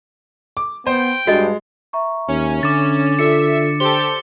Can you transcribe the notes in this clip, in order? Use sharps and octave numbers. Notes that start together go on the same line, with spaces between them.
D6
B3 C5 G5
G2 G#3 F#4 D#5
E5 A#5 C#6
D#2 C#4
D3 D6 A6
F4 A4 D5 E5 C#7
G4 A4 C5 D5 C6 G7